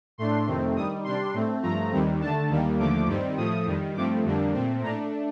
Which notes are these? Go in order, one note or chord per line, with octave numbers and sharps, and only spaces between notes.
A2 A3 D4 C6
F2 C3 D#3 A3 C4
G2 D#3 G3 D#6
C3 G3 D4 C6
A2 A3 C4
G2 F3 A3 A#5
D#2 D#3 G3 C4
D3 A3 D4 A5
D#2 D#3 G3 A#3
D#2 D3 F3 A3 D6
G2 D#3 G3 C4
A2 F3 A3 D#6
F2 D#3 G3
G2 F3 A3 C4 D6
F2 D3 G3 A#3 D4
A#2 A3 C4
A2 A3 D4 A#5